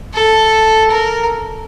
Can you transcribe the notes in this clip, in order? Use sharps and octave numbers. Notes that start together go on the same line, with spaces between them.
A4
A#4